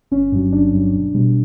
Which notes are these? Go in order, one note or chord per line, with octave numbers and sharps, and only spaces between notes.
G1 C#4
G2 F#3
G1 D4
G2 F#3
B1
B2 G3